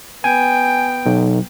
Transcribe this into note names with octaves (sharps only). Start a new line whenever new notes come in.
B3 G5 G#5
B1